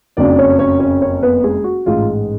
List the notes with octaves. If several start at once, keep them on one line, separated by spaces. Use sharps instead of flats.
F#1 F2 C#3 F#3 D4 D5
C#4 C#5
C#4 C#5
C#4 C#5
C#4 C#5
B3 B4
G#3 G#4
F#4
A1 G#2 G#3 F4